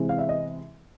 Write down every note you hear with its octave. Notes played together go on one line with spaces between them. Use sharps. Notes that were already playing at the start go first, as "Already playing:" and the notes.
Already playing: C3 E3 G#3 C4
F5
E5
D#5